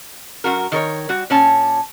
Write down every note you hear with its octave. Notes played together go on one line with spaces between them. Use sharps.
F#2 F#4 A#4
D#3 A#4 C#5
G3 F#4
A#2 C#4 A5